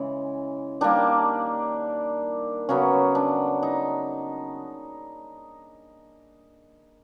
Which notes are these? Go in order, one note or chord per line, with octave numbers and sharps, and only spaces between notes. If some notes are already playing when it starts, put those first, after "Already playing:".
Already playing: C#3 E3 G#3
D#3 G3 A#3 D4
C#3 F#3 B3 C#4
D4
D#4